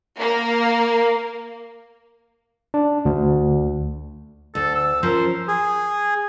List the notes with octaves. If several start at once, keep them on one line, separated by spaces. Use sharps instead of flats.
A#3
D4
D2
D2 A4
E6
F3 C#4 A#4 C5
G#4